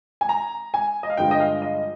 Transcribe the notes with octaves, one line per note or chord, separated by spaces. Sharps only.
G#5
A#5
G#5
D#5
F5
G2 D3 F3 G#3 G5
D#5
F5
D#5